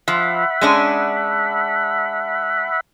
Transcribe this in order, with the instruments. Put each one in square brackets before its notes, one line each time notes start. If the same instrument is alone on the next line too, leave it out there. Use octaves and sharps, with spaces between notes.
[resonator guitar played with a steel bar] F3 [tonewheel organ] E5 F#5 B5
[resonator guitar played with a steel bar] G#3 C#4 D4